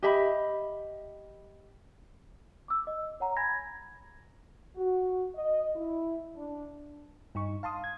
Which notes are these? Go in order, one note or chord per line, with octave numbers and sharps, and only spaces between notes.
G4 D#5 E5 B5
D6 E6
D#5
C#5 F#5 A#5
G#5 B5 G#6 A#6
F#4
D#5
E4
D4
G2 D#4 C#6
F5 A5 C6 D#6
G#6